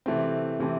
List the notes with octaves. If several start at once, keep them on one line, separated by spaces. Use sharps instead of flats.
C3 E3 A3 C4
C3 E3 A3 C4